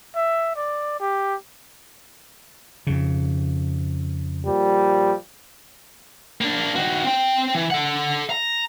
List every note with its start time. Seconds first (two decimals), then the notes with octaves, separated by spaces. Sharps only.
0.15 E5
0.56 D5
1.00 G4
2.87 F2 C#3
4.46 A#2 F3 G3
6.41 A#3 D4
6.76 D#3 F#4
7.04 C4 G5
7.55 E3
7.70 A4 F#5
8.30 A#5